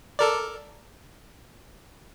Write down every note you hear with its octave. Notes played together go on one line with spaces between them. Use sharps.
A4 A#4 D5